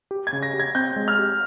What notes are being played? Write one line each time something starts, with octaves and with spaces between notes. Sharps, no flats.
G4
G#6
C#3
A#6
G4
G#6
C4 G6
G#3
F6
G4